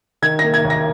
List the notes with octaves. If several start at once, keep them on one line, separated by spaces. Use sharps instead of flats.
D#3 G#6
A#3 A#6
G#6
D#2
A#6